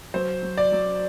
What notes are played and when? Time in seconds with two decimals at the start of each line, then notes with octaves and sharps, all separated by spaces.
0.14 F#3 C5
0.43 F#3
0.58 D5
0.72 F#3